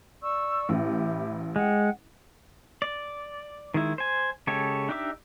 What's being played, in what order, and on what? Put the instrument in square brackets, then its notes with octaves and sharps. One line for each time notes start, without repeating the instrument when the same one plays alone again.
[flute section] D5 C#6 E6
[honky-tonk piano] A1 [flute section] E4 G4
[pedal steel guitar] G#3 [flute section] F#5 G5
[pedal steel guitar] D5
D#3 G#3 E4
C5 G#5
C#3 G#3 G4 A4 C#5
D4 D#4 G4 E5 D6